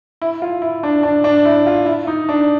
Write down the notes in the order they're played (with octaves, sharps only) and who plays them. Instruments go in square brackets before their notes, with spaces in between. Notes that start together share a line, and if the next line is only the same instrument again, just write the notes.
[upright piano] E4
F4
E4
D4
D4
D4
E4
F4
E4
D#4
D4